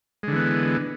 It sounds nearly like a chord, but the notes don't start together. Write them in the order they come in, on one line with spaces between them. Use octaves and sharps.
G#3 D3 E3 B3